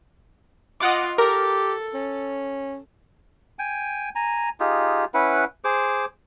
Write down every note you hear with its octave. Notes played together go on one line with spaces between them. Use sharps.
F4 D#5 F#5 D6
G4 A4 A#4
C#4
G5 G#5
G#5 A#5
D#4 F4 G4 G#4
C#4 E4 B4 F#5
G#4 C5 D6